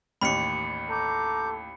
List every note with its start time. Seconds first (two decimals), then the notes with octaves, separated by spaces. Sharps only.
0.22 A1 D#2 B5 C#7
0.90 A4 A#5 D6 G6